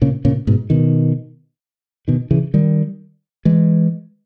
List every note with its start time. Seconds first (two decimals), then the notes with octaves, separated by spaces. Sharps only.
0.02 A#2 C#3
0.25 A#2 C#3
0.47 G#2 B2
0.70 B2 D#3
2.08 B2 D#3
2.31 C#3 E3
2.54 D#3 G3
3.45 E3 G#3